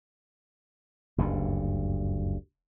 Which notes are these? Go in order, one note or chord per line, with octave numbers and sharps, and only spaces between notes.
F#1 D2 G2